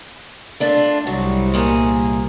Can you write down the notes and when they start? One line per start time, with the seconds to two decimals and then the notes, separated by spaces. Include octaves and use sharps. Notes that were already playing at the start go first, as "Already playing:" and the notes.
0.60 A3 D4 F4
1.07 C2 F#3
1.54 A#2 G#4